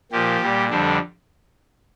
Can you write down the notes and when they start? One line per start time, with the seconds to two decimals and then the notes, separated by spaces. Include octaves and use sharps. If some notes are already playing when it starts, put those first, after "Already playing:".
0.12 A#2 F3 G4
0.41 A#2 G3
0.69 F2 D3 G3 D4